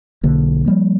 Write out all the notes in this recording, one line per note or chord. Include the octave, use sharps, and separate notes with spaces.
B1 D3 A#3
F3 G3 A#3